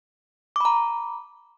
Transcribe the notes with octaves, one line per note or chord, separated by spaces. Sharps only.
A#5 B5 D6